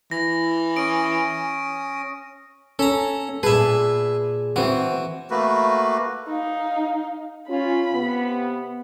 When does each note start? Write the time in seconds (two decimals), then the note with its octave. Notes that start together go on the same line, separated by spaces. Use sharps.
0.11 E3 A#6
0.76 C#4 D#6 D7
2.79 C#4 A4 A#5
3.43 A#2 G#4 B4 E5 A5
4.56 E3 C4 F#4 F#5
5.30 A3 A#3 F#4 B4
6.27 D#4 F5
7.49 C#4 F4 B5
7.93 C3 B3